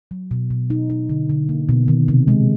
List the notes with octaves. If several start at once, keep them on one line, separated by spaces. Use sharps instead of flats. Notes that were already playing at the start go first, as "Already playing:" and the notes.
F#3
B2
B2
D#4
D#4
D3
D3
A#3
B2
D#3
C3
G#3